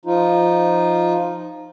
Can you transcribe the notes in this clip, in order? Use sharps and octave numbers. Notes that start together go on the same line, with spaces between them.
F3 D#4 F4